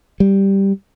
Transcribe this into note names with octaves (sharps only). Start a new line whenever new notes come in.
G3